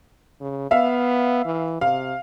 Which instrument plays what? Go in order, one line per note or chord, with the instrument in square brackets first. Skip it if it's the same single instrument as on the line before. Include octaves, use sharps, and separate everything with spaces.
[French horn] C#3
[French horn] B3 [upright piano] E5 F5
[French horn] E3
[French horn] C3 [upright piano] F5